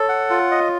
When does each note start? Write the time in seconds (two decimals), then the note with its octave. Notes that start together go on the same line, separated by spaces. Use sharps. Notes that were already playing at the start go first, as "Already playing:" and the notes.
Already playing: A4 C#5
0.09 F#5
0.30 F4
0.51 D#5